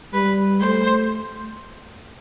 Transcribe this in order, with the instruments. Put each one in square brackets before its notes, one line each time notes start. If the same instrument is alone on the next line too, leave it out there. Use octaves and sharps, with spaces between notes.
[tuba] G3 [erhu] B4
[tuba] A3 [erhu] C5